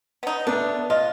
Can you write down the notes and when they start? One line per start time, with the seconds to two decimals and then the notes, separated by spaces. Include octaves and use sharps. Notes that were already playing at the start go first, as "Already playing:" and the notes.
0.23 B3 D#4
0.47 A3 B3 D4
0.90 F4 D#5